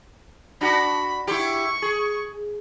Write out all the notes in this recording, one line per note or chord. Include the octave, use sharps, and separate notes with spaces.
D4 F#4 B5
E4 G4 C#6
G#4